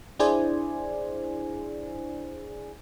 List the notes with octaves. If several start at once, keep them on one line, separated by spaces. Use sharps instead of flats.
D4 E4 G#4 C5 D5 G#5